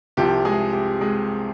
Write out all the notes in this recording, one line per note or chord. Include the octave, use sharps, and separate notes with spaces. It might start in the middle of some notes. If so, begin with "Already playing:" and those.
C2 C3 F3 G4
G#3 G#4
G4
G#3 G#4